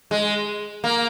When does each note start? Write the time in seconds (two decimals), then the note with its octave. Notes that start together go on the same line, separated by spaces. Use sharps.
0.11 G#3
0.84 A#3